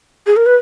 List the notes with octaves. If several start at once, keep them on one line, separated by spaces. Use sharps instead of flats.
G#4
A#4
B4